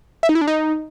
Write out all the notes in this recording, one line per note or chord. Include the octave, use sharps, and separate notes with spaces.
E5
D#4
E4
D4
D#4